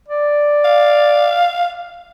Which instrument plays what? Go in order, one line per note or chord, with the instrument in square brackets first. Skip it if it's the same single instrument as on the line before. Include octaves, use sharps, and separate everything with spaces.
[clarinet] D5
[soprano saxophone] F5